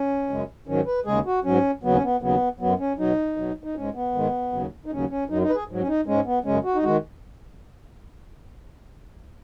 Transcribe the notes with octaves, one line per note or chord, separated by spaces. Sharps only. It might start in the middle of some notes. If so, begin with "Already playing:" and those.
Already playing: C#4
F#2 C#3 G#3
G#2 D#3 F#3 C#4
B4
D#2 C#3 G#3 G#4
F#4
G#2 F#3 C#4
D#2 C#3 F#3 B3
C#4
B3
D#2 C#3 F#3 B3
F#2 F#3 B3
C#4
B2 F#3 D#4
B2 F#3
D#4
G#2 G#3 C#4
B3
G#2 D#3 G#3
D#2 C#3 F#3
D#4
D#2 C#3 F#3 C#4
C#4
F#2 F#3 D#4
D#4
B4
G#4
G#2 F#3
C#4
D#4
G#2 G#3 C#4
B3
F#2 C#3 G#3 C#4
F#4
D#4
D#3 G#3 F#4